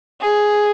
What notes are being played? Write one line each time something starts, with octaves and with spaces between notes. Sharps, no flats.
G#4